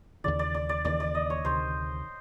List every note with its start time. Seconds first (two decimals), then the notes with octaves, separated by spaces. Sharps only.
0.24 D#2 C#3 E3 D5
0.39 D5
0.54 D5
0.69 D5
0.85 D#2 C#3 E3 D5
1.00 D5
1.15 D#5
1.30 C#5
1.45 D2 C3 D#3 C5